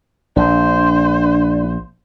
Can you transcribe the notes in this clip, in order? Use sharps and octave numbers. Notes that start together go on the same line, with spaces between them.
A#1 D4 C5